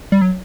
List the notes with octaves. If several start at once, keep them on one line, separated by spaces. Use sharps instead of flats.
G3
F#3